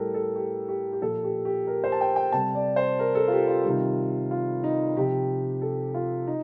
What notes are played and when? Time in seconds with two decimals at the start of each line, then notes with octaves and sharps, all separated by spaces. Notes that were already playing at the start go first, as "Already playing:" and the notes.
Already playing: A2 G3 G4 A4 A#4
0.14 A4
0.35 G4
0.68 G4
0.93 G4
1.01 A#2 F3 A4
1.24 G4
1.45 G4
1.67 A#4
1.84 C5
1.92 A5
2.01 G5
2.16 G5
2.32 C3 G3 A5
2.55 D5
2.76 C5
2.99 A#4
3.15 A4
3.28 F4
3.32 G4
3.48 F4
3.64 C3 D#3 G3
4.31 F4
4.64 D#4
4.97 C3 F3 G4
5.62 A4
5.94 F4
6.27 D#4